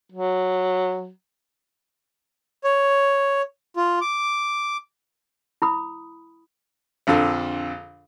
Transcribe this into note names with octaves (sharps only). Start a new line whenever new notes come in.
F#3
C#5
F4
D6
E4 B5 D#6
A#1 F2 D3 F4 A4